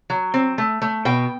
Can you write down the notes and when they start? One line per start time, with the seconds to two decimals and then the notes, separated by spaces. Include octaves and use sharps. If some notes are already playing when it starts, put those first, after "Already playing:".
0.10 F#3
0.34 C4
0.58 A3
0.82 A3
1.05 B2 G5